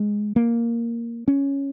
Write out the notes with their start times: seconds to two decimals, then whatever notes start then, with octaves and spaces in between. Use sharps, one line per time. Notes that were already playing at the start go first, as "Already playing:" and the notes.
Already playing: G#3
0.36 A#3
1.28 C#4